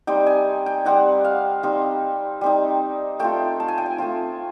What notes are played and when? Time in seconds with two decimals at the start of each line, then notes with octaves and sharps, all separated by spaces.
0.07 G3 C4 D#4 G5
0.27 G#5
0.66 G5
0.85 G3 C4 D#4 F#5
1.24 F5
1.63 G3 C4 D#4
2.41 G3 C4 D#4
3.19 A3 C4 F4 G5
3.60 A5
3.68 G#5
3.78 G5
3.86 G#5
3.98 A3 C4 F4